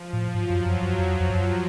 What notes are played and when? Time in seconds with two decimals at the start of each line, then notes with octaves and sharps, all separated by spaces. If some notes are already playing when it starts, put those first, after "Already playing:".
Already playing: F3
0.13 A2
0.34 G#2 F#3
0.50 F#2
0.66 F#2
0.83 F#2
0.98 F2
1.20 F2
1.30 F#2